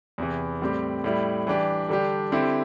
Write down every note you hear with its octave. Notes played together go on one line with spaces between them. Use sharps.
E2 C3 E3
A2 G3 C4 G4
A2 G3 E4
E3 G3 D4 G4
D3 G3 D4 G4
D3 C4 E4 G4